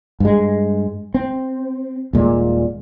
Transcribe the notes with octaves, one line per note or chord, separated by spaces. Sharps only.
G2 G#3
C4
D#1 A#2 G#3